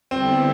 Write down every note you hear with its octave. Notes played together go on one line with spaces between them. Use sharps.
D3 G3 B3 C4 E4 A4